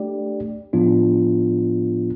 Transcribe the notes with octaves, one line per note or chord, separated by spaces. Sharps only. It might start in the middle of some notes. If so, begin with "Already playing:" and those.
Already playing: A3 D4 G4 D5
A2 F3 B3 D4 F4